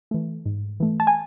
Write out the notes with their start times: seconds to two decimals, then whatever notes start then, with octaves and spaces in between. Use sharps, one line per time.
0.11 E3 A3
0.46 G#2
0.80 E3 A3
1.00 A5
1.07 G#5